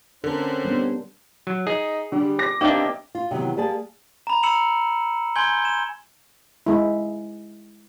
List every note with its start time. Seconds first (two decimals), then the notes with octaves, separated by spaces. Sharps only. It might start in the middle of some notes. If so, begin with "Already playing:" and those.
0.24 D3 C4 C#4 A4 A#4 C5
0.65 G3 B3 D4
1.47 F#3
1.67 D#4 G#4
2.12 D3 G3
2.39 D6 A#6
2.61 A#3 C4 D4 D#4 G4 E5 G5
3.15 F4
3.31 C3 D#3 E3 F#3 B3
3.57 G3 A#3 G#4 A5
4.27 A#5 B5
4.43 A#5 B5 E6 C#7 E7 F#7
5.36 G#5 C6 G6 G#6 G7
5.62 G#6 E7
6.66 G#3 E4